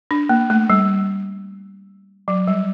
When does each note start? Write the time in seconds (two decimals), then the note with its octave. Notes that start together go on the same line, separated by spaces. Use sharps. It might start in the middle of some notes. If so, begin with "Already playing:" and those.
0.11 D4
0.29 A#3
0.50 A3
0.70 G3
2.28 F#3
2.47 G3